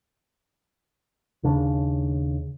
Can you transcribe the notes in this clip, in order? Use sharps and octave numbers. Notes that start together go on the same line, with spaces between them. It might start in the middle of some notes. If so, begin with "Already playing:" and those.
D#2 C#3 D4